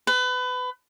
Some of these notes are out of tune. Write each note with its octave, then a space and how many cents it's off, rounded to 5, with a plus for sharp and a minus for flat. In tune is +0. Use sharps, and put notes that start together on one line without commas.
B4 +25